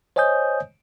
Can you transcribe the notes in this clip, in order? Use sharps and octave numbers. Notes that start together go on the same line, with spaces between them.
C5 C#5 D#5 G#5 D#6 G6